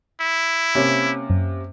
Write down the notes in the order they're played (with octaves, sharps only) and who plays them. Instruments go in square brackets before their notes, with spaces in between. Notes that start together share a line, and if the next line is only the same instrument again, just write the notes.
[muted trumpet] E4
[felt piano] C3 A#3 C#4
[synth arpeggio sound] F#2